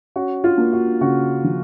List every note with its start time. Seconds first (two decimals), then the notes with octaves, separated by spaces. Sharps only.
0.16 C#4 F#4
0.44 F4
0.58 A#3
0.73 F#4
1.01 C#3 F#4
1.44 F3